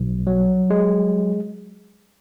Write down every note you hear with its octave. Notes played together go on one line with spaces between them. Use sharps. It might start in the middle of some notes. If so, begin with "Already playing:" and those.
Already playing: B1
F#3
G#3